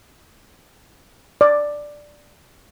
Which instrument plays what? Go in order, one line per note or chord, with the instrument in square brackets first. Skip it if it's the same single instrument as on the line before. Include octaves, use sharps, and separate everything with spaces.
[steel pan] D5